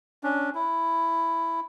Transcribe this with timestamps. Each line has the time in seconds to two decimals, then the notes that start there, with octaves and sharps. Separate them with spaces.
0.23 C#4 D4
0.55 E4